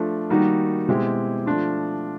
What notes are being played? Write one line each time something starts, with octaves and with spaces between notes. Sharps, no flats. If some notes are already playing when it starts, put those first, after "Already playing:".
Already playing: F3 A3 D4
D#3 G3 A#3 D#4 F#4
B2 G#3 C4 E4 G4
F3 A3 D4 F4